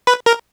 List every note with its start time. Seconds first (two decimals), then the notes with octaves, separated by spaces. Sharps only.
0.07 B4
0.26 A#4